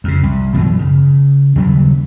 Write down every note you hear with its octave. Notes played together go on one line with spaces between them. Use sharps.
F2 C#3
C2
F#2 B2 E3 F3
C#3
D#2 C#3 F#3 G3